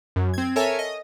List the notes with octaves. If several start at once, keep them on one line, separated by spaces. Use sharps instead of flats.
F#2
C4 G#6
A4 A#4 C#5 E5 G#5
D#5